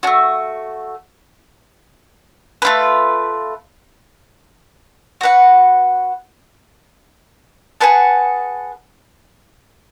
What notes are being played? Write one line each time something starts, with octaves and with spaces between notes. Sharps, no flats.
A3 D4 F#4
A3 F4 B4
F#4 B4 F#5
G#4 B4 F#5 A5